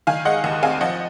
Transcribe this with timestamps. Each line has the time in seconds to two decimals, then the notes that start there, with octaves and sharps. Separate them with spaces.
0.07 D#3 F5 G#5
0.25 G#3 D#5 F#5
0.44 D#2
0.63 C4 F5 G#5
0.81 F3 D#5 F#5